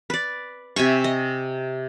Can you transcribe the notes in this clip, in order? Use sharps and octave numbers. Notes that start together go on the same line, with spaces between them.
B4 D5
C3 E5 G#5 C#6
D#5